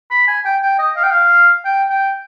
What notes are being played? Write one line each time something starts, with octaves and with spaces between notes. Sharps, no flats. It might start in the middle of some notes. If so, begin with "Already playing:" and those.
B5
G#5
G5
G5
D#5
F5
G5
F5
G5
G5